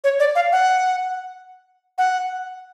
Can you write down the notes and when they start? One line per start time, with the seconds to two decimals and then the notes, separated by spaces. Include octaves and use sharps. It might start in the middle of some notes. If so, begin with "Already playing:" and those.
0.04 C#5
0.19 D5
0.35 F5
0.52 F#5
1.98 F#5